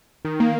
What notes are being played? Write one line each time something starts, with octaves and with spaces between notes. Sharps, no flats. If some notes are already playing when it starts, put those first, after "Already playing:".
D#3
A#3